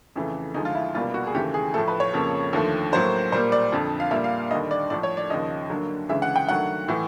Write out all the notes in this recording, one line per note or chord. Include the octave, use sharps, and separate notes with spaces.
F2 C#3 E3 A3
D2 D3 F3 G#3 D#4
F4
E4
C2 B2 G3 A#3 F4
F#4
G#4
D#2 C#3 E3 A3 G4
G#4
A2 F3 A3 A4
B4
C#5
F2 C#3 F3 A#3
D#2 D3 F3 A3
A2 F#3 A#3 C5
A#2 G3 A#3 C5
D5
F2 D3 F3
F5
A#2 G3 A#3 E5
F5
D#2 D3 G3 D#5
D5
A2 F3 A3 D5
C#5
D5
D#2 C#3 F3 D#5
G2 D3 F#3 A#3
D2 C#3 E3 G#3 E5
F#5
G5
G2 D#3 F#3 A3 F#5
A2 E3 A3